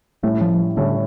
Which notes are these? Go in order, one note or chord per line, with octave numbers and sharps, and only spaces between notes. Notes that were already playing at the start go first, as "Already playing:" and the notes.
A2 G3 A3 C#4 E4
F3
A2 D3 G3 C#4 E4